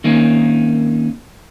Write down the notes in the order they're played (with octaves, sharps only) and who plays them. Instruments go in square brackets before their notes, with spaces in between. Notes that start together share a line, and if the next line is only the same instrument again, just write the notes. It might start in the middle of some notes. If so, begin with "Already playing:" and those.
[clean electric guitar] D#3 A#3 C4 C#4 D#4